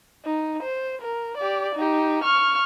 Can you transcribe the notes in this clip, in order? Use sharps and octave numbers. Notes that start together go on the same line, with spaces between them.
D#4
C5
A#4
G4 D5
D#4 G4
C#6 F6